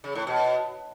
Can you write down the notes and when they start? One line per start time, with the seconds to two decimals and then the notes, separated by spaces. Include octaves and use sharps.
0.04 C#3
0.15 A2
0.27 B2